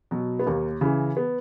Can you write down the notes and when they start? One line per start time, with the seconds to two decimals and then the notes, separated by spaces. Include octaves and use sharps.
0.11 B2 F#3
0.40 B3
0.46 D#2 A#3
0.81 C#3 E3
1.17 B3